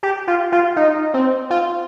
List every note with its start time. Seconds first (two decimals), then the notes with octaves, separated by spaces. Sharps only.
0.03 G4
0.27 F4
0.52 F4
0.76 D#4
1.14 C4
1.50 F4